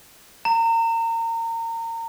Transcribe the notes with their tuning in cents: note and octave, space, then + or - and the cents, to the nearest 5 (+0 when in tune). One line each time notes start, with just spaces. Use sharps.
A#5 -30